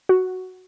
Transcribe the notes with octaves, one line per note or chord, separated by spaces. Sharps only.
F#4